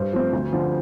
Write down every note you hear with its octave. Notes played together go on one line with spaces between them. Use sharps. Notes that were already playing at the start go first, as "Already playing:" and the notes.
Already playing: G2 C5
F3 A3 C4
D2
D3 F3